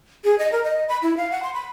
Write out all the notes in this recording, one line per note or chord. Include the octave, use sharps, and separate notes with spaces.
G#4
D#5
A#4
D#5
B5
E4
F5
F#5
C6
B5